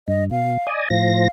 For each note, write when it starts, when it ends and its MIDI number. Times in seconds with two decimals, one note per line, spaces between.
0.08 0.30 43
0.08 0.24 75
0.31 0.58 47
0.31 0.69 77
0.67 0.88 74
0.67 0.88 75
0.67 0.88 80
0.90 1.28 45
0.90 1.28 53
0.90 1.30 77
0.90 1.28 94